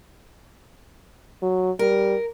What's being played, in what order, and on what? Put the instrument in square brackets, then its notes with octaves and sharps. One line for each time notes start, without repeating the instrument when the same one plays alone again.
[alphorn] F#3
[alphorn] G3 [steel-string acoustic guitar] A#4